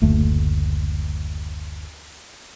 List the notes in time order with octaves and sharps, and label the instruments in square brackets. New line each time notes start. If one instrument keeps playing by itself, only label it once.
[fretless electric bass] F#1 D2 A3